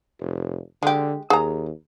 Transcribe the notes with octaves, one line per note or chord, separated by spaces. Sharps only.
F1
D3 G#3 G4
D#2 G#4 A#5